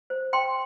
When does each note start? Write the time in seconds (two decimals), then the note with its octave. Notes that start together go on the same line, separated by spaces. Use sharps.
0.10 C5
0.33 G5 C6